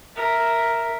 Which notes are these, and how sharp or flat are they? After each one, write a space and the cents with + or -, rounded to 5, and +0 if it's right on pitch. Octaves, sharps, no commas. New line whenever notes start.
A#4 +0 E5 +0